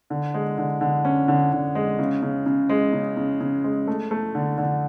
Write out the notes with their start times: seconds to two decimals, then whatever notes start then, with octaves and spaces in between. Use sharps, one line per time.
0.10 D3
0.34 G#3
0.58 D3
0.81 D3
1.05 C#4
1.28 D3
1.52 D3
1.75 G#3
1.99 C#3
2.23 C#3
2.46 C#3
2.69 G#3
2.93 C#3
3.17 C#3
3.41 C#3
3.64 G#3
3.87 A3
4.11 A3
4.35 D3
4.58 D3